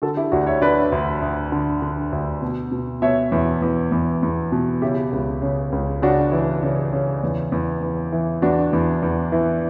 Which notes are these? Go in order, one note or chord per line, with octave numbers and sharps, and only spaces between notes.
D3 F#4 A4
E4 G4
D2 D4 F#4
F#5
C#5 E5
D3 B4 D5
D2
D2
D3
D3
D2
B2
B2
B2 C#5 E5
E2
E2
E2
E2
B2
C#3 E4 G4
C#2
C#3
C#2
C#3 D4 F#4
E3
C#3
C#3
E2
E2
E2
E3
E2 D4 F#4
E2
E2
E3